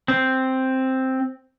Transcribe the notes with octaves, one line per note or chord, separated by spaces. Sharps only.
C4